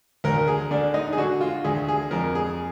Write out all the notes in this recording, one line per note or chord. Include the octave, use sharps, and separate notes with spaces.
D2 A#4
G#4
D3 D4
D#4
G#4
D3 F#4
F4
D2 G#4
G#4
F2 A#4
G#4